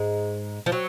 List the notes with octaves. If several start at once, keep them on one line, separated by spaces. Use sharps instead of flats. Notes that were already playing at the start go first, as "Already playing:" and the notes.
Already playing: G#2 G#3
F3
F#3